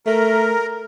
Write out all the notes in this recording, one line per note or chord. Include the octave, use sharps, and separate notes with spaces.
A3 A#4